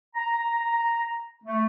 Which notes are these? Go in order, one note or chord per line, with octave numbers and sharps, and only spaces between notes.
A#5
A3